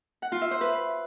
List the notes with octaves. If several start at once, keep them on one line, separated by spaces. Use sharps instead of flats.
F#5
F4
E5
C5
B4